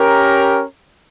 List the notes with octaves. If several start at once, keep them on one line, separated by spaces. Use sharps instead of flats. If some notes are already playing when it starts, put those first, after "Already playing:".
Already playing: C#4 G4 A#4